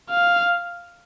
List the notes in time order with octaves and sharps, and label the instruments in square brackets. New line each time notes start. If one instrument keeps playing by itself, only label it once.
[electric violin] F5